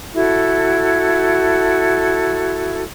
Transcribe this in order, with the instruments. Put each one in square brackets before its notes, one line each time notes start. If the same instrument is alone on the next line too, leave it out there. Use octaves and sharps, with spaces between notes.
[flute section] E4 F#4 A4